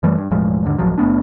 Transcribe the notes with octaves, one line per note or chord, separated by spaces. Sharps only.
F#2 E3 G3 A3
G2
E1 A2 F3 G#3
D#2 G#2 D3
D1 A1 F3 F#3
F#1 A3 B3 D4